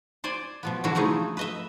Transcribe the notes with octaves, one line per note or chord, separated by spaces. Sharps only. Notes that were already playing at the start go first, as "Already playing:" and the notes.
C5 D5 G#5
B2 F3 B3
D3 E3 G3 C#4 E4 F#4
C#3 F3 A3 D#4 G#4
B4 D#5 E5